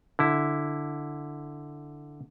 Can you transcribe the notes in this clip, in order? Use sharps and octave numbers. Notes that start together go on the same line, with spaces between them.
D3 E4